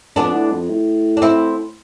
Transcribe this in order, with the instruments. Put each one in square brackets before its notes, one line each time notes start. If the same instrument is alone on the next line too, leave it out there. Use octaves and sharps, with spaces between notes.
[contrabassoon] F2 [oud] B3 D4
[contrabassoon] A2
F2
A2
[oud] D4
C4 E4